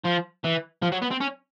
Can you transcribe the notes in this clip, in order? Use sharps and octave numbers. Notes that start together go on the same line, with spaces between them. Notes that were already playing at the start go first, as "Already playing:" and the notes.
F3
E3
F3
F#3
B3
C4
C#4